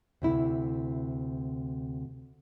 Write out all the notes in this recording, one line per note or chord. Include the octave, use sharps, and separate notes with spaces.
D2 C3 E4